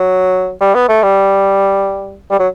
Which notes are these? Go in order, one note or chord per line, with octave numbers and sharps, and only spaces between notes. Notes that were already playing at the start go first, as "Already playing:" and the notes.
Already playing: F#3
G3
B3
A3
G3
G3
F#3